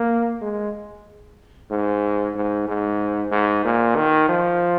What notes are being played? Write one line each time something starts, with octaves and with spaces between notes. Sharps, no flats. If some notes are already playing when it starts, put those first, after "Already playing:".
Already playing: A#3
G#3
G#2
G#2
G#2
G#2
A#2
D#3
F3